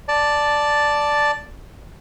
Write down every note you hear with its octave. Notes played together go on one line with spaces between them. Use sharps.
D5 A5